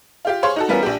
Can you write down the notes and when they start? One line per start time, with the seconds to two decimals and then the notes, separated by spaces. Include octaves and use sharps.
0.25 F4 G4 F5
0.43 G#4 C5 C#5 F5 C6 C#6
0.56 D#4 F#4 A4
0.68 E3 G3 B3 C#4 F4 A#4
0.83 A#1 D4 G4